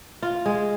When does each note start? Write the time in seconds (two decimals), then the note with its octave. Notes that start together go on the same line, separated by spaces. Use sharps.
0.22 F4
0.46 G#3